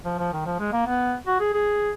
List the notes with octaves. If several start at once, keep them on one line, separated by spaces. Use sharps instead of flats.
F3
F3
D#3
F3
G#3
A#3
B3
F#4
G#4
G#4